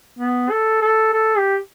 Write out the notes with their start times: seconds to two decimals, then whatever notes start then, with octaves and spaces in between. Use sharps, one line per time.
0.19 B3
0.51 A4
0.82 A4
1.13 A4
1.38 G4